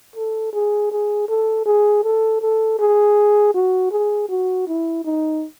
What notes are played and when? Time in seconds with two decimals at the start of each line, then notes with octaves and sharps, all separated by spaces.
0.16 A4
0.53 G#4
0.92 G#4
1.29 A4
1.66 G#4
2.04 A4
2.42 A4
2.79 G#4
3.54 F#4
3.91 G#4
4.29 F#4
4.67 E4
5.05 D#4